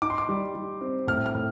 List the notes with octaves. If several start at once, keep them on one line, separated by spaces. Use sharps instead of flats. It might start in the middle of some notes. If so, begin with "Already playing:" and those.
D#4 D6
C6
D6
G3
G3
C4
A2 F6
F6
A2